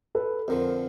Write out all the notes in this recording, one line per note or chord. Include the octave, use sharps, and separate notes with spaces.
A4 B4
F2 D3 F3 A#4 C5